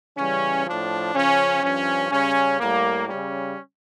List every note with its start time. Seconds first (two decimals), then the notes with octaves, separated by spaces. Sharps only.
0.17 C#3 E3 G3 C#4
0.66 A2 F3 D4
1.14 C#3 F3 C#4
1.63 G2 F3 C#4
2.11 C#3 G3 C#4
2.60 A2 G3 A#3
3.09 C#3 G3 C#4